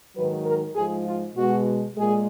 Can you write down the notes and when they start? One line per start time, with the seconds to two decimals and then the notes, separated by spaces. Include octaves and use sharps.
0.15 G#2 D#3 F#3 B4
0.45 A#4
0.75 G#2 F3 G#3 G#4
1.06 F4
1.36 B2 G#3 F#4
1.96 A#2 G#3 G#4